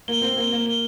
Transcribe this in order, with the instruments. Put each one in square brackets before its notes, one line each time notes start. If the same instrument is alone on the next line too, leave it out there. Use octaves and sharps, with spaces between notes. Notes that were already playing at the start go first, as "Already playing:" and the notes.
[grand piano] A#3 [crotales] G7
[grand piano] C4 [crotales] G7
[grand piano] A#3 [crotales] G7
[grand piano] A#3 [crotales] G7
[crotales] G7